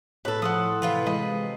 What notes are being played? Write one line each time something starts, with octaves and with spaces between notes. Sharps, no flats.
A2 A4 B4
F3 F#5 C6 D#6
C3 E3 F4 B4
G#3 D#5 B5